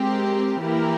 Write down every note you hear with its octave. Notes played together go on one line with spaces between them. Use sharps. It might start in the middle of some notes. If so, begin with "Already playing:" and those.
Already playing: G#3 C4 G4 A#4
E3 A#3 E4 G4 A#4